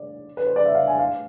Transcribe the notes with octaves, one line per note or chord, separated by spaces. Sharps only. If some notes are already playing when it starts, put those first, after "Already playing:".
Already playing: D5
B4
C5
D5
E5
F5
G#5
F5